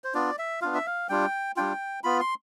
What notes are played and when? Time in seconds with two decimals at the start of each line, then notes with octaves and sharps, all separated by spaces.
0.04 C5
0.14 B3 D4 F4 D5
0.38 E5
0.61 B3 D4 F4 F5
0.74 E5
0.86 F5
1.09 G3 D4 F4 G5
1.56 G3 D4 F4 G5
2.04 B3 F4 B5
2.20 C6